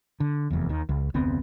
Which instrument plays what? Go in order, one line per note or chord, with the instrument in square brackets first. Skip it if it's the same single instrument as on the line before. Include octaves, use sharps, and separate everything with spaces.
[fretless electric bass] D3
F1 E2
D#2 D#3
C#2
F1 D2 B3 C4